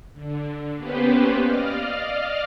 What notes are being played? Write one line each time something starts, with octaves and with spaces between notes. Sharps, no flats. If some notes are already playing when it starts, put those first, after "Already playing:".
D3
A#3 B3 C#4 G4 B4 C5
D5 D#5 F5 F6